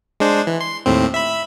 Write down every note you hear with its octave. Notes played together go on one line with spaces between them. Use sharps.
G#3 D4 C5
E3
C6
D#2 A2 C4
E5 B5